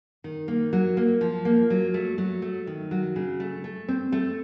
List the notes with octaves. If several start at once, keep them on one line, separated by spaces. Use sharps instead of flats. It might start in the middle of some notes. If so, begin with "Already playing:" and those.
D#3
A#3
F#3
A#3
F3
A#3
F#3
A3
F#3
A3
D#3
F#3
C#3
A3
A3
C4
A3